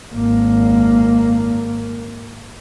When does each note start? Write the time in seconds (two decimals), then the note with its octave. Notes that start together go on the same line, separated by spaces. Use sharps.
0.12 G#1 A#3